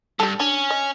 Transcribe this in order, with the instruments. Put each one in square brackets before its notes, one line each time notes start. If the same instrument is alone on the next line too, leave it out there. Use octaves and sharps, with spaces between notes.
[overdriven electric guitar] G2 [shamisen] G4 A4
[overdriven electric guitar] C#4 [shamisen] D4
[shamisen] D#5